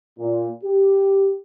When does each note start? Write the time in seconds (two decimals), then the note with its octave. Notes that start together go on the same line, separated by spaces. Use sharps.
0.19 A#2
0.64 G4